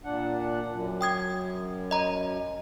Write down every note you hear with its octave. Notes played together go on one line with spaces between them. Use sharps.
A#2 D4 F#5
F#2
G5 D#6 G#6
D#5 A#5